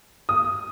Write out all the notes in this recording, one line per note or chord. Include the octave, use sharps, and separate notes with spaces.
D#6